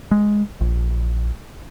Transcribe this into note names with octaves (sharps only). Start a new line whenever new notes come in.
G#3
A#1